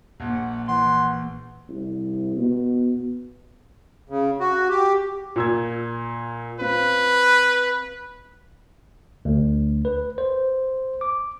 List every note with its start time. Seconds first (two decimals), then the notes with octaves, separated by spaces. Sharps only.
0.20 A#1 A#2 F#5
0.68 E3 F#5 C6
1.70 C2
2.37 B2
4.09 C#3
4.40 F#4
4.69 G4
5.36 A#2 E6 G#6
6.60 C4 F4 B4
9.25 D2
9.85 B4
10.18 C5
11.01 D6